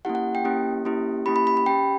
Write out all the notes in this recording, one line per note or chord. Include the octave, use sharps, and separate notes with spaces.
A#3 C#4 E4 G4 F#5
F#5
G5
A#3 C#4 E4 G4
A#3 C#4 E4 G4
A#3 C#4 E4 G4 B5
B5
B5
B5
C#4 G4 G5